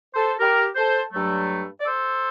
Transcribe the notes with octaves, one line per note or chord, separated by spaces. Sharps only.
A4 C5
G4 A#4
A4 C5
G2 F#3 A3
D5
A4 C5